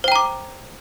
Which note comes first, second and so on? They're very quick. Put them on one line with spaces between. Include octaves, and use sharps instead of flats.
C5 G5 A#5 D6